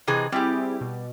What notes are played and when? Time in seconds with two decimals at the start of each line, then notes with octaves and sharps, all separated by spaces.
0.07 C3 E3 G#4 D#5
0.32 G3 C4 E4 G4 G#4
0.81 B2